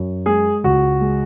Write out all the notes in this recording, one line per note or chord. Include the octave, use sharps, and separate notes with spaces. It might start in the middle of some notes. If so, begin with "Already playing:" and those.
Already playing: F#2
G#3 G#4
C#2 F#4
G#3